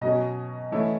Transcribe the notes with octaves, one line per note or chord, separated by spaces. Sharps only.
B2 F#3 C#4 D#5
E3 A3 C#4 E4